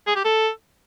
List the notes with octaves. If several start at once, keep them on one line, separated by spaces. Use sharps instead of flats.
G#4
G4
A4